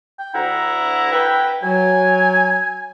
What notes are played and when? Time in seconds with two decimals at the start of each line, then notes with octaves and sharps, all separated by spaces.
0.19 G5
0.34 D2 E4 F#5 A#5
1.12 B4 G5
1.63 F#3 G#5